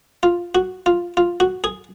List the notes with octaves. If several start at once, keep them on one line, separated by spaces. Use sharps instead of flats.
F4
F#4
F4
F4
F#4
G#4